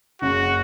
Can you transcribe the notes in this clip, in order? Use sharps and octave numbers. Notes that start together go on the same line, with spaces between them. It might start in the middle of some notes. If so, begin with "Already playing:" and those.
F#1 F#2 C#3 F#4